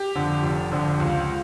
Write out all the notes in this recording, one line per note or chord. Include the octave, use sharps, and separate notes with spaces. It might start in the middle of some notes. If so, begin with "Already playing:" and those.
Already playing: G4
F2 D3
F1
F2 D3
C#2